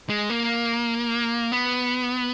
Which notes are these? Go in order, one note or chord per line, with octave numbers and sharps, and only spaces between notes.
G#3
A#3
B3